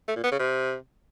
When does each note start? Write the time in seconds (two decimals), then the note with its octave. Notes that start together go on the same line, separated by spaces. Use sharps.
0.08 A3
0.16 A#2
0.24 B3
0.32 C#3
0.40 C3